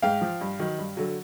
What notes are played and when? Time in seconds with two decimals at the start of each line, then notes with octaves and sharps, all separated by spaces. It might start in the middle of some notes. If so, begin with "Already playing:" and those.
0.02 G#2 F5 G5
0.21 F3
0.41 G2
0.59 D#3 F#3
0.78 G2
0.97 D3 F#3